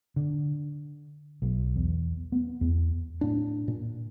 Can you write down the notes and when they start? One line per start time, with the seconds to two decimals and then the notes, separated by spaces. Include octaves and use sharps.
0.16 D3
1.42 B1
1.76 E2
2.32 B3
2.61 E2
3.21 A2 D4
3.68 A#2